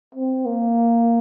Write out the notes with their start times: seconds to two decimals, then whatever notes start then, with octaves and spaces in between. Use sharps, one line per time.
0.15 C4
0.46 A#3